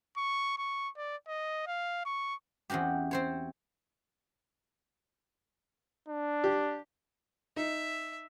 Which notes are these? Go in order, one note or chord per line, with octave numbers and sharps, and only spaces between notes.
C#6
C#6
D5
D#5
F5
C#6
E2 C4 C#4 F#4 G4
C4 C5 C#5
D4
G4
D#4 E5